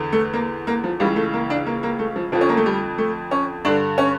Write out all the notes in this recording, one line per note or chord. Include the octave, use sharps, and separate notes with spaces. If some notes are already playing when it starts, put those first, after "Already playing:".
Already playing: E2 D3
A3
A#3
A#3
F3
C#2 C#3 E3 G3
A3
A#3
D4
A#3
A#3
A3
F3
F2 D3 F3
C#4
A#3
A3
G3
A3
C#4
G2 D3 D4
C#4